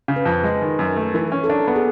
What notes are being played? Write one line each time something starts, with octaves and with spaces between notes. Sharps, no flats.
C#3
B4
F2
G#3
D#3
F#2
A3
E3
C#4
A4
D4 A#4
B3
G#4